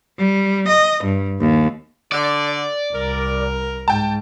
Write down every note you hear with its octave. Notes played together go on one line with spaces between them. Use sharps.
G3
D#5
G2
D#2
D3 D5
C2 A#4
G#2 G5 A5